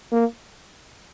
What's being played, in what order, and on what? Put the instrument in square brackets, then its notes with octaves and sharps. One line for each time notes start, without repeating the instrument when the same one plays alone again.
[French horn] A#3